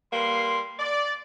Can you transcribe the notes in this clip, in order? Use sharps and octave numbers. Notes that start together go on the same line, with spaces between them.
G3 A#3 B4 C6
D5